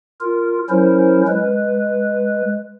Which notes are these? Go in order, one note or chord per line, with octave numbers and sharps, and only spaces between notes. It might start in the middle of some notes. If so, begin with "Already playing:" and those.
F4 A#4
F#3 C#4 E4 A#4 C5
G#3 B4